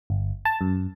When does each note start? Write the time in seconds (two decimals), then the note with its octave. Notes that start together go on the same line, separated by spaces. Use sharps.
0.10 G1
0.45 A5
0.61 F#2